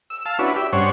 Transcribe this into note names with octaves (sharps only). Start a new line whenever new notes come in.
E6
F5 A5 E6
C#4 D4 E4 F#4 B4
G4 E5
G2 C#4 D4 C5 C#5 F#5